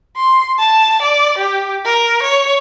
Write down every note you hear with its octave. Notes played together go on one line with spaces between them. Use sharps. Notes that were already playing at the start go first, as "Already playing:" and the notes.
C6
A5
D5
G4
A#4
C#5